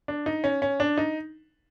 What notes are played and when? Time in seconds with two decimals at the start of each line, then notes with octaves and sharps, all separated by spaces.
0.08 D4
0.26 D#4
0.44 C#4
0.62 C#4
0.80 D4
0.97 D#4